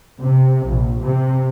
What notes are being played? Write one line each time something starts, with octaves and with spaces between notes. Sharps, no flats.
C3
A#1
C3